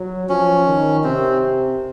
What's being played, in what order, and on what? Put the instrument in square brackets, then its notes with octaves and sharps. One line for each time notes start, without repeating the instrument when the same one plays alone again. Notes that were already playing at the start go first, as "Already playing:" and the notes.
Already playing: [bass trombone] F#3
[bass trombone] F3 [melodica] C#4
[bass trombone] D#3
[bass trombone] C3 [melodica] C4